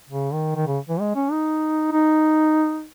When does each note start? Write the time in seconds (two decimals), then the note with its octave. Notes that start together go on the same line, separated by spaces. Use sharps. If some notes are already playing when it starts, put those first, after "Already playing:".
0.09 C#3
0.33 D#3
0.56 D#3
0.66 C#3
0.89 E3
1.00 G#3
1.15 C#4
1.31 D#4
1.92 D#4